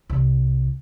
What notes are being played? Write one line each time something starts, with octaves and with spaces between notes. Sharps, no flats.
C2